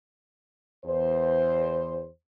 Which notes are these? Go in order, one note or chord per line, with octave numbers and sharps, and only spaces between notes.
E2 C5